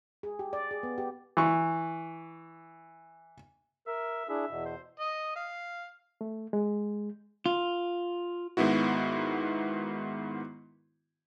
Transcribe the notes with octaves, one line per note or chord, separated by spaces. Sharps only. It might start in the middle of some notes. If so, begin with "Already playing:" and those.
G#4
G4
D5
G#4
B3
G4
E3 C#6
A#4 E5
D4 E4 G#4 E5
E2 B2
C5
D#5
F5
A3
G#3
F4
G#2 D#3 B3 E4 F#4